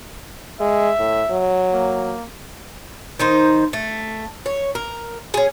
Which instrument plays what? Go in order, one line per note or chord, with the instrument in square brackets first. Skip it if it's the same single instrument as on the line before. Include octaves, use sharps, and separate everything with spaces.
[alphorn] G#3 [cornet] E5
[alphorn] A2
F#3
[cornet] A#3
[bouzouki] D#3 D#4 C5
A3
C#5
A#4
C#4 G#4